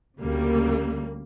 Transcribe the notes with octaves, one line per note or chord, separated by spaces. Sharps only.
D2 C#3 G3 A#3